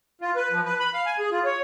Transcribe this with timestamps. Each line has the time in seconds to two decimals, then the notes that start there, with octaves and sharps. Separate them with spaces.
0.21 F4
0.36 B4
0.51 F3
0.65 B4
0.80 B5
0.93 F5
1.06 G#5
1.19 G#4
1.32 F4
1.45 C#5